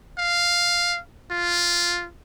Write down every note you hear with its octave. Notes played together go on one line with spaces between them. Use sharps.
F5
F4